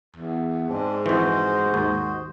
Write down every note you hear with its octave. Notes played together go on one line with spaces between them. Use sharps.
E2
G#2 C4 D4
F2 E3 F#4 C5 D#5
D#2